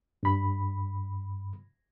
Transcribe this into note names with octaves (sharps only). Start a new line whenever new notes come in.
G2 B5